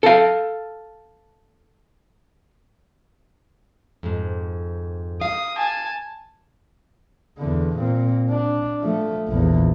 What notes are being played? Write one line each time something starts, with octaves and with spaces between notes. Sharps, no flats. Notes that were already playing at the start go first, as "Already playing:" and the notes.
A4 F5
F2 G#2
F5 D#6
G#5 A5
E2 D3
A#2 C4
D4
F3 A3
A#1 E2